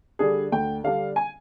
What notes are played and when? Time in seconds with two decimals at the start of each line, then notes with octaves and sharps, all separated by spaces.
0.19 D3 G3 D4 G#4
0.52 D2 G5
0.84 D3 G3 D4 F5
1.16 G#5